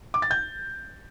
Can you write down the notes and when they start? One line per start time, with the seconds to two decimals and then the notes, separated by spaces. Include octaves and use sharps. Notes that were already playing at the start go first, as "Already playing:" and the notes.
0.14 D6
0.22 A6
0.31 G6